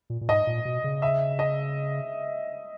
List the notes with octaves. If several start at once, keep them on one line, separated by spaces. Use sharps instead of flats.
A#2
A#2
G#2 D#5
A#2
B2
C#3
E5
D#5